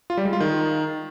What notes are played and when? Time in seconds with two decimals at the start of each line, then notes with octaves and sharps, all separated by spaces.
0.10 F4
0.17 G3
0.25 G#3
0.33 F4
0.40 D#3